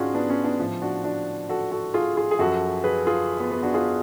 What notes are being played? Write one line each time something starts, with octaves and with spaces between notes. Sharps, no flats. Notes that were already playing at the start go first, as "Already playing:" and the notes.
Already playing: G#2 C#4 D4 F4 F#4 G#4
B3 D4
C#4
B3 D4
A2 F3
D4 F#4
D4 F#4
F#4 A4
F#4 A4
F4 G#4
F4 G#4
G#4
F#2 F3 F#4 A4
G#4 B4
F4 G#4
B3
B3
D4 F#4
F4 G#4